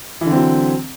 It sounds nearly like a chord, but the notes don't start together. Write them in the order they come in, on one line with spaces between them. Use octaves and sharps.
E3 D3 C4 F#3